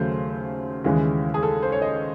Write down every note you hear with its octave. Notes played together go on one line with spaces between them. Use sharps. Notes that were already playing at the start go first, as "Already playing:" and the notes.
Already playing: D#2 C#3 F#3 A3 C5
D#2 C#3 E3 G#3
G#4
A4
C5
C#5
D#5